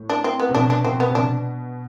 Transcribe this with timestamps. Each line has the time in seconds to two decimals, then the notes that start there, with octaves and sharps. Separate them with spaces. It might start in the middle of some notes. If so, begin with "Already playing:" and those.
Already playing: A2 A3
0.10 D4
0.24 C4
0.40 B3
0.49 C3
0.55 B2 D4
0.70 D4
0.85 B2 C4
1.00 B3
1.09 C3
1.15 B2 D4